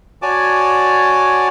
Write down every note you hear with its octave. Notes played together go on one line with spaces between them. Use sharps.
F#4 C#5 D5 G#5 A5 D6